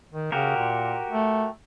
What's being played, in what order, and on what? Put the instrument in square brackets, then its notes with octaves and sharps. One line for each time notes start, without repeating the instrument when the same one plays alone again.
[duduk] D#3
[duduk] C#3 [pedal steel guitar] F#4 G4 A#4
[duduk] A#2
A3